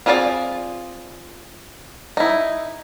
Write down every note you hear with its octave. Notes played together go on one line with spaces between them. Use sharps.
C4 F4 G#4 A#4 D5
D#4 E4